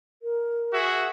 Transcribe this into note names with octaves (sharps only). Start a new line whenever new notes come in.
A#4
F#4 G#4 E5